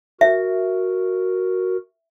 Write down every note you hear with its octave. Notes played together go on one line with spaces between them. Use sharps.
F#4 A#4 E5